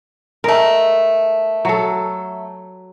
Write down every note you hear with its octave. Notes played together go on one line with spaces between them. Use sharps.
G#3 A3 A#4
F#3 A4